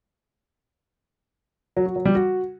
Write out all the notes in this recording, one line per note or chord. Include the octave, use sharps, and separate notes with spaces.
F#3
F#4
F#3
G3
F#4